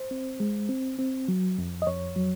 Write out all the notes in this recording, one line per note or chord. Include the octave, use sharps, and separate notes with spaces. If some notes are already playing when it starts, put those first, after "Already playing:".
Already playing: C5
C4
G#3
C4
C4
F#3
F2
D#5
F2 C#5
F#3